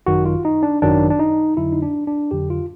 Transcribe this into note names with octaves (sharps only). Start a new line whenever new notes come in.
G#1 F#2 D#3 F#3 F#4
F4
D#4
D4
G#1 F#2 D#3 F#3 D4
D4
D#4
F2 D3 F#3 E4
D#4
D4
D4
F2 D3 F#3 G4
F4